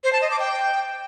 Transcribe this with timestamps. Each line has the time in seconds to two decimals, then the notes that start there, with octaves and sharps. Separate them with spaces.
0.04 C5
0.13 A5
0.22 D#5
0.31 D6
0.39 G5